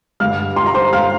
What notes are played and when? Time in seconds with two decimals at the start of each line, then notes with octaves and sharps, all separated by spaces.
0.20 G2 D3 G3 F5 F6
0.56 C6
0.66 A#5
0.74 C5 C6
0.93 F5 F6